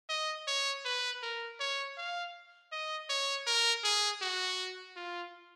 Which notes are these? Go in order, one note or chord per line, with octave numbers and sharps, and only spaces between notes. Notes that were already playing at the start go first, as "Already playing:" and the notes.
D#5
C#5
B4
A#4
C#5
F5
D#5
C#5
A#4
G#4
F#4
F4